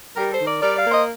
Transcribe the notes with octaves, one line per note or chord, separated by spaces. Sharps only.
G3 G4 A#4
A4 C5
D#3
A#4 D5
G3 A#4 D5
D5 F5
A#3
C5 D#5